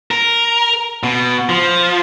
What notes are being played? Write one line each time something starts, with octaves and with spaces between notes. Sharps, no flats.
A#4
B2
F3